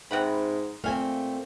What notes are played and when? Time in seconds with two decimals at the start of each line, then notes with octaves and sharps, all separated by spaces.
0.11 G#2 C3 F#5 B5
0.84 A#2 A3 C4 F5 G#5